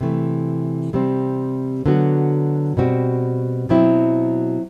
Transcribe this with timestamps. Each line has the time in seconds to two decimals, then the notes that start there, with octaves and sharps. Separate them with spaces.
0.01 C3 E3 A3
0.93 C3 G3 C4
1.86 D3 F#3 B3 F#4
2.77 B2 G3 C4 F#4
3.69 B2 F#3 C4 E4